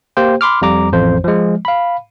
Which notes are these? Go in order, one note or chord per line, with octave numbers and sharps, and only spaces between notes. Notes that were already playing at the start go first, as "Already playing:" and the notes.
A#3 G4 C5 G5
B5 C6 D6 F6
F2 G3 A#5 D6
A1 F2 C5
F3 G#3
F5 B5